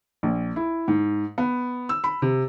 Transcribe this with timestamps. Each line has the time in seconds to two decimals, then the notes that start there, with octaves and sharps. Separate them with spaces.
0.23 A#1
0.56 E4
0.88 G#2
1.38 B3
1.89 E6
2.04 B5
2.22 C3